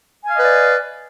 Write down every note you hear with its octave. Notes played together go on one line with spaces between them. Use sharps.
B4 D5 D#5 F5 G#5